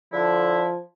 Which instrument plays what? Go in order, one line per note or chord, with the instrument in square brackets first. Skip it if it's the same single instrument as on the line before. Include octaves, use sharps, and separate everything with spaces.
[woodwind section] D3 E4 [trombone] F3